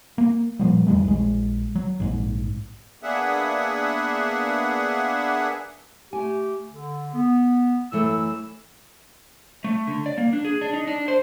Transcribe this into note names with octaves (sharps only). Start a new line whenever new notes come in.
A#3
A#2 F3 G3
E2 D#3 G3 A3
A#1 G#3
F#3
A#1 G#2
A#3 B3 D4 G#4 E5 F#5
A3 G4 G#5
D3
B3
F#2 E3 A3 E6
A3
D3
D5
A#3
D4
G#4
D4
D#4
D4
C5